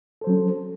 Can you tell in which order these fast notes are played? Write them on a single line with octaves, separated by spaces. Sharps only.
A4 C5 F#3 C#4